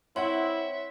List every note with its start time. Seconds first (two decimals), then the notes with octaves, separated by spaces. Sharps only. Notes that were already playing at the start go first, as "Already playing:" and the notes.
0.16 C4 E4 C#5 E5 F#5 C6